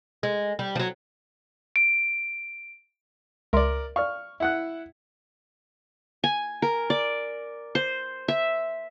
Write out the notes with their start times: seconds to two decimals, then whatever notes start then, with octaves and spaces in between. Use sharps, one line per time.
0.23 G#3
0.59 G3
0.76 F3 F#3
1.76 D7
3.53 C#2 A#4 D5 E5 C6
3.96 D5 F5 C#6 F6
4.40 E4 F#5 F#6
6.24 G#5
6.62 A#4
6.90 D5
7.75 C5
8.28 E5